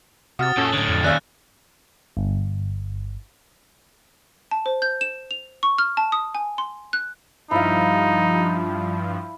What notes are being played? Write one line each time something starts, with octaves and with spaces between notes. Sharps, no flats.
C3 F#4 D#6 F6 A6
A#2 C#4 A4
A2 D3 C#5 A5
F2
D#2 C#4 D5 E5 F5 F#6
G1
A5
C5
G6
E7
F7
C#6
F6
A5
D#6
G#5
C6
F#6
G2 F3 D#4 E4 F5